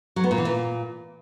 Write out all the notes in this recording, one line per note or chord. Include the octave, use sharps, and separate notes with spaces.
F#3
B3
A#2
E3
A#2